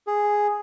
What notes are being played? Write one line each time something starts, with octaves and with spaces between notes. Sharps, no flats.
G#4